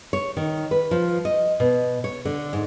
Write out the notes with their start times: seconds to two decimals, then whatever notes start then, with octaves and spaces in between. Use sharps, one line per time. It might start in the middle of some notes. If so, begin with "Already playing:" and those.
0.13 C#5
0.37 D#3
0.71 B4
0.91 F3
1.25 D#5
1.60 B2
2.04 C#5
2.25 D3
2.53 G#2